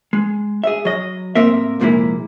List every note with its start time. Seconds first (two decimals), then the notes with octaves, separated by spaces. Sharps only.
0.13 G#3
0.64 G#4 E5
0.85 F#3 D#5
1.35 A2 A#3 C4 A#4 E5
1.80 C2 F2 A#2 G#3 A#3 E4